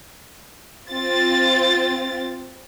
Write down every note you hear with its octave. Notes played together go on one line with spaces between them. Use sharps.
C4 F4 A6